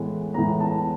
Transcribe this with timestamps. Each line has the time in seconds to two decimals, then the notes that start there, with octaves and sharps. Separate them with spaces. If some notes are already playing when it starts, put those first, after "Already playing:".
Already playing: A2 E3 G#3 B3
0.34 A2 E3 G#3 B3 A#5
0.60 A5